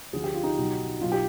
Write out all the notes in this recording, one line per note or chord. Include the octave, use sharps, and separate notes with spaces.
D2 D3 F3 G#4
G4
F4
D#4 G4
B1 B2
B1 B2 F4
G4